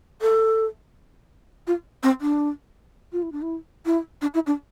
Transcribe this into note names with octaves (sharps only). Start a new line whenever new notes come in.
A4
F4
C4
D4
F4
E4
D4
E4
E4
D4
E4
D4